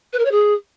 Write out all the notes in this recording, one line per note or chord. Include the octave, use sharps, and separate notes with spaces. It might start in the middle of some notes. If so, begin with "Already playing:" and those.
B4
A#4
C#5
G#4